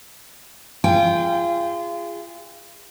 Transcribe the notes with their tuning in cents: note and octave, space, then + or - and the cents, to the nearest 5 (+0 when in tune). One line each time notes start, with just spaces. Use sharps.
F4 -30 G#4 -20 G5 +0